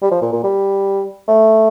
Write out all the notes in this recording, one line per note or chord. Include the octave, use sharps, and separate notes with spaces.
G3
F3
A#2
A#2
G3
A3